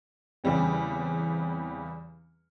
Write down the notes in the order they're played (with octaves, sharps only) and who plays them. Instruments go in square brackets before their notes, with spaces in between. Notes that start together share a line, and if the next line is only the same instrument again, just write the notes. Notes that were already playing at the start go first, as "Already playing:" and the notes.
[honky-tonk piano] E2 C#3 G3 C4